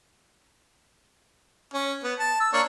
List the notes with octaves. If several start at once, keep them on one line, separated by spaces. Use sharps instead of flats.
C#4
B3
A5
E6
A#3 D4 C#5